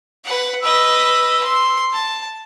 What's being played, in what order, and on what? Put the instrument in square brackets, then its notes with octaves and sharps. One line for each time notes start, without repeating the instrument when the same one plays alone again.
[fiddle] B4 F#5
[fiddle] B4 D#5 [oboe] E6
[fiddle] C6
A5